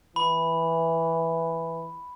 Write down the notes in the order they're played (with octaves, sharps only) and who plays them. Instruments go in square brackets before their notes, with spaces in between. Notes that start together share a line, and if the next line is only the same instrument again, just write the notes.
[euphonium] E3 [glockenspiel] B5